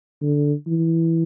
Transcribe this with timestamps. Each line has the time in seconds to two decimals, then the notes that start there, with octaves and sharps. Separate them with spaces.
0.22 D3
0.67 E3